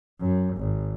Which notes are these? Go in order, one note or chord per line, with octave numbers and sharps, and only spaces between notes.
F#2
G#1